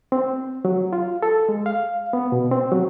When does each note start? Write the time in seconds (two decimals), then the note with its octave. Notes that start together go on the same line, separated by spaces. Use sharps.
0.12 C4
0.65 F#3
0.93 F4
1.23 A4
1.49 G#3
1.66 F5
2.13 B3
2.32 B2
2.51 C4
2.72 F#3